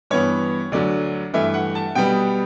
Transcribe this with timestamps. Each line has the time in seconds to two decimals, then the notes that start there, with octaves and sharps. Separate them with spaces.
0.10 G2 E3 B3 C#5
0.72 D2 D3 F#3 D5
1.33 G2 E3 A3 E5
1.54 F#5
1.75 A5
1.95 B2 G3 B3 G5